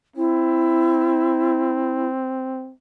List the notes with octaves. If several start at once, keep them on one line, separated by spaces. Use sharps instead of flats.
C4 E4